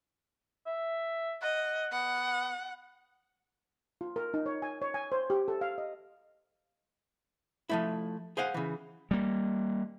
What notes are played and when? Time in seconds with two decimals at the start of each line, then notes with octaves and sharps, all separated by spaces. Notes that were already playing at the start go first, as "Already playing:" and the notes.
0.66 E5
1.42 D#5 F#5
1.93 B3 F#5
4.01 F4
4.16 A#4
4.34 D#4
4.46 C#5
4.62 G#5
4.82 C#5
4.94 G#5
5.12 C5
5.30 G4
5.48 A4
5.61 F5
5.78 D#5
7.69 F3 A3 E4
8.37 G#4 C5 F5 F#5
8.54 C#3 E3
9.11 G3 A#3